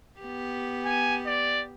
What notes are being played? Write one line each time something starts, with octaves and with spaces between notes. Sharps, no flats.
B3 G4
G#5
D5